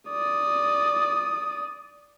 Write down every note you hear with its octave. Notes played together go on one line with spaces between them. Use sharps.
D5 D#6